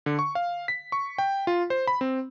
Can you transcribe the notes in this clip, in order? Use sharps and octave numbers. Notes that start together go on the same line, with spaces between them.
D3
C#6
F5
B6
C#6
G5
F4
C5
B5
C4